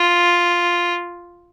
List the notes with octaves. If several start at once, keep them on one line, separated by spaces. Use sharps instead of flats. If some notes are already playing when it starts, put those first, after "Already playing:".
Already playing: F4